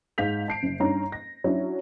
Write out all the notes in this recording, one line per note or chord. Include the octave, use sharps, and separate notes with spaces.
G#2 F5 G6 B6 F7
A5 C7 D7
F#1
G2 C#4 D#4 A#5
A#6
F#3 C#4 D4 E4